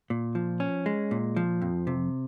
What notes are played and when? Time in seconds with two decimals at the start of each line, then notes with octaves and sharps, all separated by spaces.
0.10 A#2
0.35 F3
0.60 C#4
0.86 G#3
1.11 A#2
1.36 F3
1.62 F2
1.87 C3